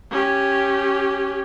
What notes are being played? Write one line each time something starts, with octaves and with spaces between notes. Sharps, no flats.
C#4 G4